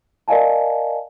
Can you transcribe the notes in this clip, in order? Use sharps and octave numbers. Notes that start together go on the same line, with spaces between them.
A#4 D5 D#5 F5 G#5 A5